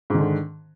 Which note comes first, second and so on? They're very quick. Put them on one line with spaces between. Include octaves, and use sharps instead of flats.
G#2 D#3 D3